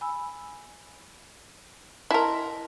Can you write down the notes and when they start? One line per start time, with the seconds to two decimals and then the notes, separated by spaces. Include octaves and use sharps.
0.01 G#5 B5 E6
2.11 E4 A#4 D#5 A5 C6